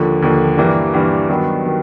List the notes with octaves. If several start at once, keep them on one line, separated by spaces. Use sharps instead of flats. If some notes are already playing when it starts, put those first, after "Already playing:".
Already playing: D#2 D3 F3
D#2 D3 F3
G2 E3 G3 A#3 D4
G2 E3 G3 A#3 D4
G2 D#3 F#3 B3
D#3 F#3